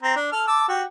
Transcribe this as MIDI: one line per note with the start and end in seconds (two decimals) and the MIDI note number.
0.03 0.16 60
0.03 0.16 82
0.16 0.30 62
0.32 0.47 69
0.32 0.47 89
0.47 0.68 81
0.47 0.68 86
0.47 0.68 88
0.68 0.83 66
0.68 0.83 67